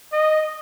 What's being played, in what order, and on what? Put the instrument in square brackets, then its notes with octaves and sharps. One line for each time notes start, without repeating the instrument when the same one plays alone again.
[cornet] D#5